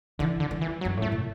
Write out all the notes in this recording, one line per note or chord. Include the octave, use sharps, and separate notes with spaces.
D3 E3
D3
E3
E3
F#3
F#2
A2
A3
B2